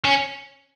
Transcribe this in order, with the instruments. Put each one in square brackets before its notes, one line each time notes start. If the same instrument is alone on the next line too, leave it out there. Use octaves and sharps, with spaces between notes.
[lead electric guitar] C#4